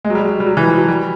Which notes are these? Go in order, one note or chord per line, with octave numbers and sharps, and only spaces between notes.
G#3
F#3
G3
F#3
G3
F#3
E3
F3
F#3
G3